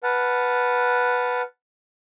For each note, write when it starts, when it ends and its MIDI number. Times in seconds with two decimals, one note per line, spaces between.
0.03 1.42 71
0.03 1.42 78
0.03 1.42 81
0.03 1.42 89